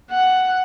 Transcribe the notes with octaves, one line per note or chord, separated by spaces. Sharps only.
F#5